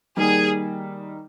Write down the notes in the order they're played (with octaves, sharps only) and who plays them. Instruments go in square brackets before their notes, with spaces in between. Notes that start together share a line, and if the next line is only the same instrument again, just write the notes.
[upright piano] D#3 G3 A#3 D#4 [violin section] G#4